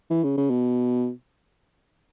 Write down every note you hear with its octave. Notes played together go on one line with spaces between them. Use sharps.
E3
C#3
C#3
B2